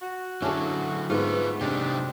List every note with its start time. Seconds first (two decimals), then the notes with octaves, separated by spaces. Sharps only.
0.02 F#4
0.42 D3 F#3 C#4 D4 E4 G#4 A4
1.10 G#2 A3 B3 F4 B4
1.61 C3 F#3 D4 D#4 G4